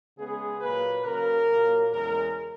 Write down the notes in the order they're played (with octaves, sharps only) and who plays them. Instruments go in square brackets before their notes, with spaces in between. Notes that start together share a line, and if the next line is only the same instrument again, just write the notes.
[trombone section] C#3 G#3 B3 G#4
A#2 F#3 A#3 B4
C#3 F#3 A#3 A#4
A#2 F#3 A#3
E2 C#3 G#3 A#4